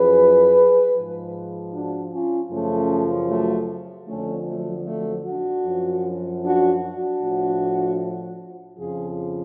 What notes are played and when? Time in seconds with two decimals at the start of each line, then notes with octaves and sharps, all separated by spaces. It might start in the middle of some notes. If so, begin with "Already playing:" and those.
Already playing: F#2 F3 G#4 B4
0.94 F3
0.99 G#2
1.73 D4 F#4
2.11 C#4 F4
2.51 F#2 C#3 F3 A3 C#4
3.29 F#3 A3
4.07 F2 D3 F3 A3 C#4
4.47 F#3 A3
4.85 F#3 A3
5.25 D4 F#4
5.65 F#2 F3
6.43 D4 F#4
6.82 D4 F#4
7.21 A2 F3
8.78 F2 C#3 F3 F4 G#4